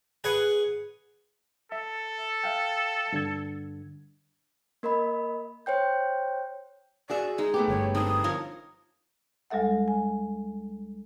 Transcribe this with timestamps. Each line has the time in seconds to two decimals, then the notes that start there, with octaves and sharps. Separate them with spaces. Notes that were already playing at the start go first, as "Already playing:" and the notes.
0.24 G#4 B4 C#5 F#5
1.72 A4 E5
2.44 E5 F5 G5
3.12 G2 D3 G#6
4.83 A#3 A#4 D#5 B5
5.66 C5 C#5 G5 G6
7.10 F#4 G#4 D5 E5
7.38 G#3 D#4 G#4
7.54 A3 B3 G4
7.68 G1 C#5
7.95 C4 D4 D#4 D#6
8.24 F3 A#4 C#5
9.50 D2 G3 G#3 A4 E5 F#5
9.88 G#5